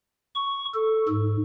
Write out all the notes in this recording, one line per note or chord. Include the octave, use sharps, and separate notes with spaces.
C#6
A4
G#2